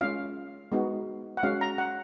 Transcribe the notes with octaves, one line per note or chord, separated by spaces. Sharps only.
G#3 C#4 F4 F5
G#3 B3 D#4 F#4
F#5
G#3 C#4 F#4 F5
A#5
F#5